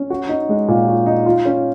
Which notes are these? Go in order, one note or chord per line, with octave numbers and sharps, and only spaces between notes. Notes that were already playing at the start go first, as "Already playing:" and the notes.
Already playing: C#4
F#4
D#4
G#3
A#2
F#4
D#4
F4
C#4